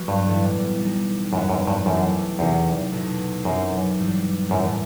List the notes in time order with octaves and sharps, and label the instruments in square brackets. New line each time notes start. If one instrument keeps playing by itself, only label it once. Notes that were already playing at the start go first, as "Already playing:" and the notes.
Already playing: [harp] F#3 B3 F#4 B4
[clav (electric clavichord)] G2
[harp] A2 E3 G3 B3 E4
B2 G3 D#4
[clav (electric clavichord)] F#2 [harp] F#3 B3 E4
[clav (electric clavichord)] F#2
G2
[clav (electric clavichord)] F#2 [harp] E3 A3 C4 E4 G4
[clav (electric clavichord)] E2 [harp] C3 F#3 C4 D#4 G4
[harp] E2 B2 A3 D#4
[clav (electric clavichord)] F#2 [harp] B2 F#3 C4 D#4 G4
[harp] G2 E3 G3 C4
[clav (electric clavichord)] F#2 [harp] A2 E3 A3 D#4 G4